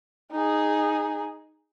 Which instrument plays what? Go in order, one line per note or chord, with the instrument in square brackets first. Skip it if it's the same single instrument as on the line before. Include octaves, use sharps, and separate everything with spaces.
[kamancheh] D#4 G#4